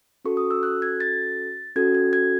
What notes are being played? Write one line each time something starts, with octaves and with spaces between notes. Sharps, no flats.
C#4 F#4 A4 C#6
D#6
E6
F#6
G#6
A6
C#4 F#4 A4 G#6
G#6
G#6